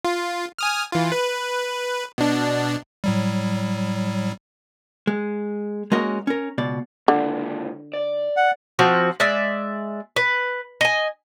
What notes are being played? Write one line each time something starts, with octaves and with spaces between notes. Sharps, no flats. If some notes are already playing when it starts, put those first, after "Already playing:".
F4
G#5 D#6 F6
E3 F4
B4
B2 D4
A2 F#3 G3
G#3
G#3 A#3 C#4 F#4 A#4 D#5
C#4 A#4
C#2 B2 D5
C#2 A#2 D3
D5
F#5
F3 C4 F#4
G#3 D5 E5
B4
D#5 G#5